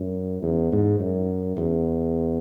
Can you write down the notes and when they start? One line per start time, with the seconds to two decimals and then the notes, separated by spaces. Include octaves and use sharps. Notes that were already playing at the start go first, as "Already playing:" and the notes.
Already playing: F#2
0.42 E2
0.72 G#2
0.99 F#2
1.57 E2